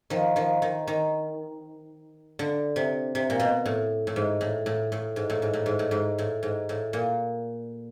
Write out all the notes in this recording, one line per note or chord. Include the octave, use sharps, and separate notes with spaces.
D#3 F3
D#3 F3
D#3
D#3
D3
C3
C3
A#2
B2
A2
A2
G#2
A2
A2
A2
G#2
A2
G#2
A2
G#2
A2
G#2
A2
G#2
A2
A#2